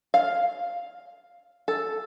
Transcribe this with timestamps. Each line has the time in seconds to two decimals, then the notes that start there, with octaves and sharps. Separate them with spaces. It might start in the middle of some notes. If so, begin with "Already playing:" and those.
0.14 F5
1.68 A4